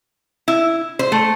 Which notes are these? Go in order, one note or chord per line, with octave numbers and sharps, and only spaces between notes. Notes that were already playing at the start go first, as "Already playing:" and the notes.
E4
C5
A3